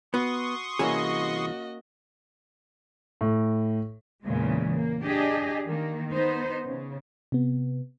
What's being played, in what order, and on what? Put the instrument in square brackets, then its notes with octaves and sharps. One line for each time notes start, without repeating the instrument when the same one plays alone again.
[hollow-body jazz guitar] B3 [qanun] F#4 [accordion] C6 C#6 D#6
[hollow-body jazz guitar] C2 E3 G#4 [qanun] A#3 C#4 [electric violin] F#4 D#5
[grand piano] A2
[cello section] E2 A#2 C#3 G#3
A#3
D4 G4 G#4 D#5
D#3 A#3
B3 D#4 C5
C#3
[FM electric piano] C3 B3